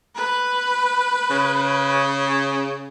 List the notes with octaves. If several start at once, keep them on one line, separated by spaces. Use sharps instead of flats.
B4
C#3